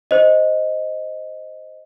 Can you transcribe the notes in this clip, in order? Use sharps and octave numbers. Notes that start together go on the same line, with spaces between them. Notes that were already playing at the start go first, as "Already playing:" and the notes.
C5 D#5